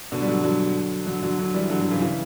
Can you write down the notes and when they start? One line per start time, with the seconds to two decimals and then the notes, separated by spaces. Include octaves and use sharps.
0.12 B2 D3
0.21 G3
0.28 D3 F#3
0.44 D3 F#3
1.06 D3 F#3
1.23 D3 F#3
1.38 D3 F#3
1.54 E3 G3
1.70 D3 F#3
1.80 D3 F#3
1.91 C#3 E3
2.01 C#3 E3